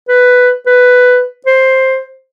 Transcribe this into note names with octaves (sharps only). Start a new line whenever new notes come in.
B4
B4
C5